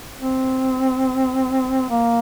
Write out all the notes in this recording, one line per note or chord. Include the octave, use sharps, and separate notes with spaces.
C4
A#3